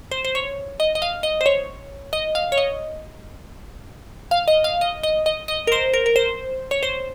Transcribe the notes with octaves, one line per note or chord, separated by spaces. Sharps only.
C5
C5
C#5
D#5
D#5
F5
D#5
C5
C#5
D#5
F5
C#5
D#5
F5
D#5
F5
D#5
D#5
D#5
D#5
A#4
C5
A#4
A#4
C5
C#5
C5